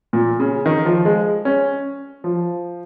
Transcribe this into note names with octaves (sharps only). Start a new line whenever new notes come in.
A#2
C#3
D#3
F3
G#3
C#4
F3